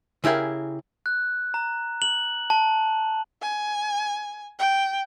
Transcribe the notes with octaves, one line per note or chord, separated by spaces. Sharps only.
C#3 E4 G4 G#4 A#4
F#6
A#5
F#7
A5
G#5
G5